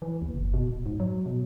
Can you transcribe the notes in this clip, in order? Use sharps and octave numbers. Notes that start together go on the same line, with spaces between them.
E3
D#2
F#1
B2
D#1
G#2
F#3
B2